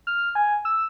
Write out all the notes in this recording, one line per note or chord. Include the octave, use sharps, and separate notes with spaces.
F6
G#5
E6